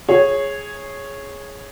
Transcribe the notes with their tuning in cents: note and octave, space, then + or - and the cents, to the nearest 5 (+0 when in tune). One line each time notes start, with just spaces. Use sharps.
G#4 +0 C#5 -10